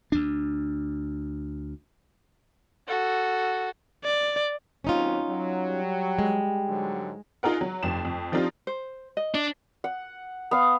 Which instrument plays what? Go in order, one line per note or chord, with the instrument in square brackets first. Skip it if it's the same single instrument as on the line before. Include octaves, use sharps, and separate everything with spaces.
[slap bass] D2 D4
[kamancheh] F#4 A4
[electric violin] D5
[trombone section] D#2 F#3 C4 [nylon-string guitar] C#4 D#4 F4
[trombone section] F#3
[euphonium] G3
[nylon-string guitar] G#3
[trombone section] G#2 D3 F#3
[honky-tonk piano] D#4 F4 G#4 A#4 F#5
F#3
F1 F2 E7
F2
F3 C4 D4 D#4 F4 G4
[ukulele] C5
D#5
[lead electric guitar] D4
[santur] F#5
B3 F5